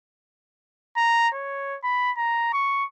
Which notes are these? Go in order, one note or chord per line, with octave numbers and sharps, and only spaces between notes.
A#5
C#5
B5
A#5
C#6